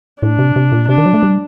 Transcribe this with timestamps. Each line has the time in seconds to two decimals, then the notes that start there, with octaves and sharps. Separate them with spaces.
0.22 A2 D4
0.39 C3
0.56 C3
0.72 A#2
0.89 C3 D4
0.98 D#3
1.06 F#3
1.14 A3
1.23 G3